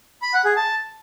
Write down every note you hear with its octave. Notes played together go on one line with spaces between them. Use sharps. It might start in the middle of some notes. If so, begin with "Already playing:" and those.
B5
F#5
G#4
A5